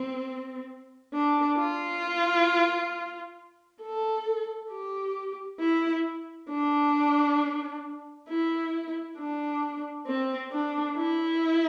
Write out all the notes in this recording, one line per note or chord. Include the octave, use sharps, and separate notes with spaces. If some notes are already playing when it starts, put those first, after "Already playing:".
Already playing: C4
D4
F4
A4
G4
E4
D4
E4
D4
C4
D4
E4